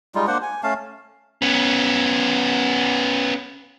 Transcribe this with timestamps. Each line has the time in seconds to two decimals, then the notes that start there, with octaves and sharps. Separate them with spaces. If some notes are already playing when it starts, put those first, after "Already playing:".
0.15 G3 G#3 D#4 F4
0.27 A#3 D4 C5 F#5
0.42 G#5
0.63 A3 C#4 F5 A5
1.42 B3 C#4